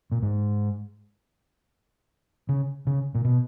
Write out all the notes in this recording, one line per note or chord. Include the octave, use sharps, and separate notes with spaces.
A#2
G#2
C#3
C#3
A#2
B2